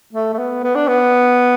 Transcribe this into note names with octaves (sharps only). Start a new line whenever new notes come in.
A3
A3
B3
B3
D4
B3